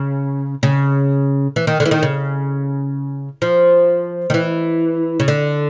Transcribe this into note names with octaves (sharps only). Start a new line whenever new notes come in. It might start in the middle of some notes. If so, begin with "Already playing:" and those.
Already playing: C#3
C#3
E3
D#3
D3
E3
D#3
C#3
F3
D#3
E3
C#3
D3